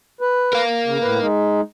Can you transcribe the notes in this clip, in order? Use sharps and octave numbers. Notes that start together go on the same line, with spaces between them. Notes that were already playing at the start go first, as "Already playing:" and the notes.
B4
A#4 F5
C#3
A2 B4
G#3 D#4